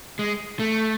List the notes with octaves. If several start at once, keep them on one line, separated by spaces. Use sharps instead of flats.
G#3
A3